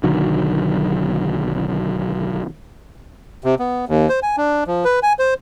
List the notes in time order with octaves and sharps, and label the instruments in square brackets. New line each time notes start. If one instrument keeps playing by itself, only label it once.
[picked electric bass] B1 D3 D#3 F#3
[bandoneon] C3
B3
D#2
C5
G#5
D4
F3
B4
G#5
C5